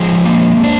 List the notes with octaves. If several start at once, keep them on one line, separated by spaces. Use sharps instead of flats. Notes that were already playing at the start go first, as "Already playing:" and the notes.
Already playing: F3 G#3 G#4
A#3
D4